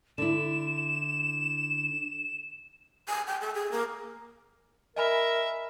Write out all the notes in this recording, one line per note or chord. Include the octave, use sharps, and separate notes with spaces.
D3 E4 E7
G#5
G5
A4
G#4
A#3
A#4 D#5 E5 G#5 B5